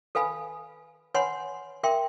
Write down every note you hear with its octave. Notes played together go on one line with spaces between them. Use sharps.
A4 B4 F5 G#5 B5
B4 C#5 F#5 G#5 B5 C6
A#4 E5 G5 C6